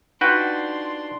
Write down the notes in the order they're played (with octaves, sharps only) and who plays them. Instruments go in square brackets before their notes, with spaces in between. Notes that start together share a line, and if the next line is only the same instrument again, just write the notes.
[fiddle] D4 C6 [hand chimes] D#4 F4 F#5 [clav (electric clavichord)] F#4 B4 G5